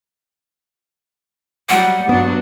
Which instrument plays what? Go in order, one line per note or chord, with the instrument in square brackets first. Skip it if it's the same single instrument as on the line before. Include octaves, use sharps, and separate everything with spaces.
[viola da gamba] F#3 G3 [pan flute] F#5
[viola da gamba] G2 F#3 D4 [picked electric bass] B3